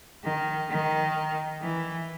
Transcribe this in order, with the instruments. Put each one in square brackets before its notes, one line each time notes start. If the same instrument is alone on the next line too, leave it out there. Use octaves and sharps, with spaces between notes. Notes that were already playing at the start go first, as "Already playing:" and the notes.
[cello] D#3
D#3
E3